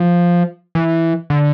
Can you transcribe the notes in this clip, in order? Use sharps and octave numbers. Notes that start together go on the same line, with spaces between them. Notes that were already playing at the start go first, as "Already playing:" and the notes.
Already playing: F3
E3
D3